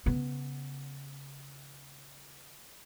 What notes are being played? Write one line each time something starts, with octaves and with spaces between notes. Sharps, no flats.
C#3 B3